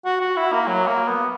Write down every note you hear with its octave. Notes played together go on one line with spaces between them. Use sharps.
F#4
F#4
E4
A#3
F#3
A#3
B3